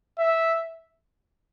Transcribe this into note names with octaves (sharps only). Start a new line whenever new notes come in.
E5